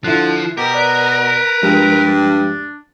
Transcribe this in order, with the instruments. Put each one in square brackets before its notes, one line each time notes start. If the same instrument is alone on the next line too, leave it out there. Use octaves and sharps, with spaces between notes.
[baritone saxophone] D3 [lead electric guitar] F3 [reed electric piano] E4 F#6
[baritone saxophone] B2 [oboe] G4 [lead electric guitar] A#4
[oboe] B4 [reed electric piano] D5
[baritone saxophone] G2 [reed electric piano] F3 G#3 G4
[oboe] D4